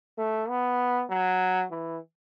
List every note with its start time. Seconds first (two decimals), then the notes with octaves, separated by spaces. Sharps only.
0.18 A3
0.49 B3
1.10 F#3
1.70 E3